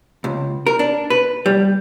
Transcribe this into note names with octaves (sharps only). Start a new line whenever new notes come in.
C#2
A#4
D4
B4
G3